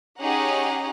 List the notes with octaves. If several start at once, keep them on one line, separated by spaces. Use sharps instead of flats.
C#4 D#4 G4 G#4 F#5 A#5